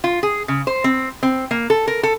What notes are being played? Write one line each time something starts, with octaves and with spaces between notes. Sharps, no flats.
F4
G#4
C#3
C5
C4
C4
A#3
A4
A#4
A4